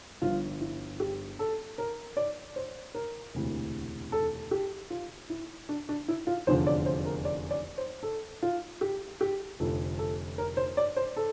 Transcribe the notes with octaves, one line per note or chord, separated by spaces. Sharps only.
G1 G2 F3 F4
E4
G4
A4
A#4
D5
C5
A#4
E1 D2 C3 E3
A4
G4
F4
E4
D4
D4
E4
F4
F1 E2 D3 F3 C5
D5
C5
A#4
D5
D5
C5
A4
F4
G4
G4
F1 F2 D3 F3 A4
A4
A#4
C5
D5
C5
A4